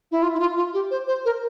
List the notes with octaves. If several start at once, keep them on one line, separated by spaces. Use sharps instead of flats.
E4
F4
E4
F4
F4
G4
C5
C5
A#4